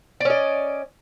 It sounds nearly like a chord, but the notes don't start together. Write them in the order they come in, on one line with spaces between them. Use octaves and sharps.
D5 C#4 D#5